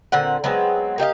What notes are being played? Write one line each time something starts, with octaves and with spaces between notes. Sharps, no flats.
A#2 D3 C4 F#5
F#3 G#3 B3 C4
A#3 G4 D#5 F5